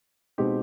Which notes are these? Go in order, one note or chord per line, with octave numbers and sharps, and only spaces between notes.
B2 G#3 C4 D#4 G4